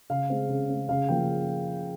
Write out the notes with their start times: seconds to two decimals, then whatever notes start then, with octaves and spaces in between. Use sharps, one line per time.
0.10 C#3 F5
0.30 G#3 C4
0.49 C#3
0.69 G#3 C4
0.89 C#3 F5
1.08 F3 A#3 C#4 G5